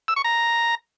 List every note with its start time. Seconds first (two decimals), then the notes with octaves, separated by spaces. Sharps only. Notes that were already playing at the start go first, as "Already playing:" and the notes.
0.08 E6
0.16 C#6
0.24 A#5